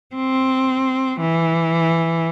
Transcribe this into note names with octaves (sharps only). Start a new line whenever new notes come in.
C4
E3